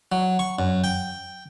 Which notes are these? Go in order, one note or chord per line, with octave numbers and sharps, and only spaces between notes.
F#3
C#6
F#2
G5